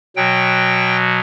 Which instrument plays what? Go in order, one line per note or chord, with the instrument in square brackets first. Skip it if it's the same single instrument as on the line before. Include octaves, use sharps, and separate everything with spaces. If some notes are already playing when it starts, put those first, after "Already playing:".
[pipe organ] B2 F#3 G5